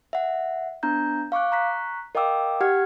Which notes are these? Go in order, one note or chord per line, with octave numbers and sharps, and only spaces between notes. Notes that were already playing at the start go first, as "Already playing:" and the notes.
E5 F#5
B3 D4 A#5 G6
F5 C#6 D6 F#6
A#5 C#6 F#6 B6
A#4 D#5 F5 G5 D6 E6
G4 F#5 F6 G#6